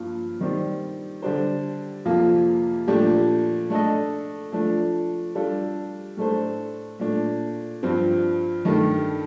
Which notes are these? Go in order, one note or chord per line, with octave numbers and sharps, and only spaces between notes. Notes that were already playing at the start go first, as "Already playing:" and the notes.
Already playing: G2 F3 A#3 F4
D#3 G3 C4 G4 D5
D3 G3 D4 G4 C5
F2 C3 F3 A#3 F4
A#2 F3 A3 D4 G4
A3 D4 A4 D#5
F3 A3 D4
G3 D4 F4 A4
A2 A3 D4 A4 C5
A#2 A3 D4
G2 F3 C4
G2 D#3 A3